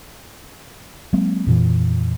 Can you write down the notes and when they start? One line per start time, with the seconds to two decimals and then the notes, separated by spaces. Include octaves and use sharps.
1.13 F#3 G#3 A#3 C4
1.47 F2 A#2 E3